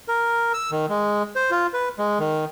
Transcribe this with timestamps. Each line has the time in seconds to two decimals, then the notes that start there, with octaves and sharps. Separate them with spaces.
0.08 A#4
0.54 E6
0.71 D#3
0.89 G#3
1.36 C5
1.51 F4
1.73 B4
1.99 G#3
2.20 D#3